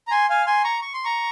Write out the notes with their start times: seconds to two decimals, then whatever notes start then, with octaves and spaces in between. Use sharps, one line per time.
0.08 A#5
0.11 G#5 C6
0.30 F5 G#5
0.46 G#5 C6
0.64 A#5 C#6
0.82 C#6
0.94 C6
1.04 A#5 C#6